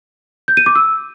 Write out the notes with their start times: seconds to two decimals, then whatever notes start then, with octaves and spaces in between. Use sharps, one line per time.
0.48 G6
0.57 D#7
0.66 D6
0.75 E6